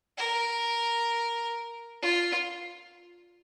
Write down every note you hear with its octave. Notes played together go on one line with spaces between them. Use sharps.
A#4
F4